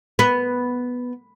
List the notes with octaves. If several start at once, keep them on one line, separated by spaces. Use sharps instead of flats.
B3